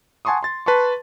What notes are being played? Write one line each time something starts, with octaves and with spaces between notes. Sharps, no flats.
F#5 G#5 A5 C6 C#6 D#6
C6 A6
B4 A5 C6 C#6